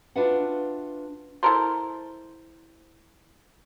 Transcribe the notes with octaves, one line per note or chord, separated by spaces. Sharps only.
D4 F4 F#4 B4 E5 F#5
E4 A4 A#4 C5